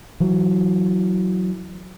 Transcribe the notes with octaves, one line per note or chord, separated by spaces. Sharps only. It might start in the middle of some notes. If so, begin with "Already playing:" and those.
E3 F#3